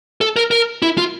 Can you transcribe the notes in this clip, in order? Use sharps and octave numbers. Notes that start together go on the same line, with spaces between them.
A4
A#4
A#4
E4
F4